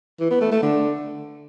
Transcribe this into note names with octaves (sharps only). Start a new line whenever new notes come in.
E3
B3
A3
A3
D3